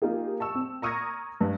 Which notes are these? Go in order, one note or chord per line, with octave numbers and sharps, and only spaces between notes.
A#3 D#4 F4 G4 G#4
A5 C#6 E6
C4
A#5 C#6 D#6 F6 G#6 A#6
G2